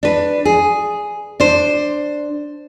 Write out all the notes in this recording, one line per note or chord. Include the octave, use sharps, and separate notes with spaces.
D4 B4
G#4
D4 C5